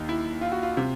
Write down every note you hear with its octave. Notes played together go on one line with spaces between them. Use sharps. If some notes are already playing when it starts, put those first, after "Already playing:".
Already playing: D#2 D#3 D#4
E4
F4
F#4
F4
C3